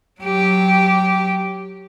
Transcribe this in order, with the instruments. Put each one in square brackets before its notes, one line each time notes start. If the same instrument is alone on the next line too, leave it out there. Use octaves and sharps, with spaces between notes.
[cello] F#3 G4